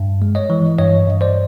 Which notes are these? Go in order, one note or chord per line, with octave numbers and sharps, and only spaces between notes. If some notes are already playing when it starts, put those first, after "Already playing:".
Already playing: G2
G#3
C#5 D#5
E3
G2 C#5 D#5
G2
C5 D5